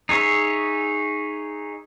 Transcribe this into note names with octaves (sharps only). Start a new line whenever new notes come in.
D#4 G#4 C#5 E5